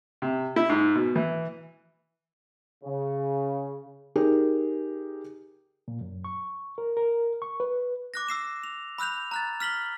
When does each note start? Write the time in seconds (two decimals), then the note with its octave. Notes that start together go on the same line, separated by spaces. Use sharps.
0.22 C3
0.56 E4
0.70 G#2
0.95 B2
1.16 E3
2.84 C#3
4.16 D#4 G4 G#4 A#4
5.88 A#2
6.01 F#2
6.25 C#6
6.78 A#4
6.97 A#4
7.42 C#6
7.60 B4
8.14 D6 F#6 A#6
8.28 E6 C7 E7
8.64 F7
8.98 B5 E6 F#6 G6 F7
9.31 A#5 F#6 A6
9.60 F6 B6 F#7 G7